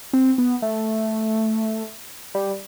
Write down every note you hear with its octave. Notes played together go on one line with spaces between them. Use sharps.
C4
B3
A3
G3